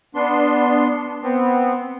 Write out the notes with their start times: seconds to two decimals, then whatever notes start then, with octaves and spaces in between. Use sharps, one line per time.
0.15 B3 D4 C6
1.23 B3 C4